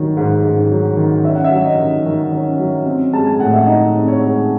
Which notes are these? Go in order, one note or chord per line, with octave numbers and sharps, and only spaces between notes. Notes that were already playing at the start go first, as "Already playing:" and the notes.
Already playing: D#3 F#3
G#2
G#2
F#3
D#3
C#4 E5
F#5
E5
F#3
D#5
D#3
D#3
C#4
F#3
C4
G#3 A5
G#5
A2 F#5
E5
D#4 D#5
C4
C#5
G#3